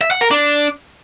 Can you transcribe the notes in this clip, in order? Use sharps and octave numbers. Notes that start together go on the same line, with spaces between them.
E5
F#5
A#4
D4